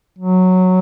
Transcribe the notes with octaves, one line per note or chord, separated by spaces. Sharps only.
F#3